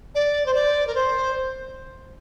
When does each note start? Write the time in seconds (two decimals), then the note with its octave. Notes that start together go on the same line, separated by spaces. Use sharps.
0.15 D5
0.46 C5
0.54 D5
0.87 A#4
0.95 C5